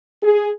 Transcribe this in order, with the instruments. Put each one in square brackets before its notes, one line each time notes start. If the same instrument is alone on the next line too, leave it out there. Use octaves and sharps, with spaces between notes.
[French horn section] G#4